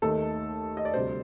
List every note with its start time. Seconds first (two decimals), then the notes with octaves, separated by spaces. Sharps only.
0.02 D#2 D#3 A3 A4
0.77 D#5
0.85 D5
0.94 D2 C3 G3 C5